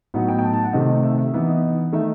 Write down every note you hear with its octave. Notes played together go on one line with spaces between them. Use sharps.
A2 F#3 B3 D#4 F#5
G5
G5
A5
A5
F#5
C3 D#3 A3 C4 D#5
E5
E5
E3 B3 D#4 E5
D#5
D#3 A3 D#4 E5